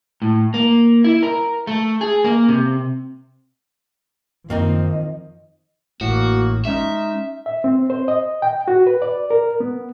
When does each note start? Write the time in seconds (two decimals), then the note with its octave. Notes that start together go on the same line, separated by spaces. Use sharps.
0.22 A2
0.54 A#3
1.04 E4
1.23 A#4
1.67 A3
2.01 G#4
2.24 A#3
2.48 C3
4.50 F#2 D#3 F3 A#3 C4 D#4 D#5
6.01 A1 A2 A#3 F#4
6.65 G2 G#3 C#4 D#4 E5
7.46 E5
7.64 C4
7.90 C5
8.08 D#5
8.42 G5
8.68 F#4
8.87 B4
9.02 D5
9.30 A#4
9.60 B3